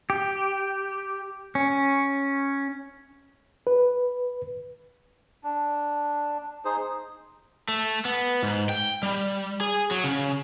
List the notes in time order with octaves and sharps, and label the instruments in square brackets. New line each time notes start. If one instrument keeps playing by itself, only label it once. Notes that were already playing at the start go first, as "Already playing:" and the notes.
[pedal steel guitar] G4
C#4
[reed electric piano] B4
[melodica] D4
D#4 G#4 C5
[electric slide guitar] A3
B3
G#2
G5
G3
G#4
F#3
C#3